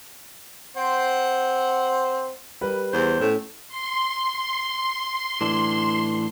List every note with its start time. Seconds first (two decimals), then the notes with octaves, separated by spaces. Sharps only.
0.77 C4 C5 F#5
2.61 G3 A#4 B4
2.93 E2 C5
3.20 A2 C#4
3.68 C6
5.41 A2 E3 D4